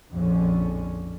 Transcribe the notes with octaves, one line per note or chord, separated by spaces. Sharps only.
A#1 F2 A2 D3 C#4